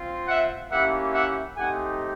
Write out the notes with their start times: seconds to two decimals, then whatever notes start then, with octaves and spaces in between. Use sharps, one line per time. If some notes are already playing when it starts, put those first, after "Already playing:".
Already playing: C4 F4
0.28 E5 F#5
0.72 A#3 C#4 E4 G4 E5 F#5
1.14 E5 F#5
1.56 A3 C4 D#4 G4 F#5 G#5